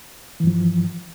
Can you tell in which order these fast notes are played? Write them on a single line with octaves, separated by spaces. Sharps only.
E3 G2 F3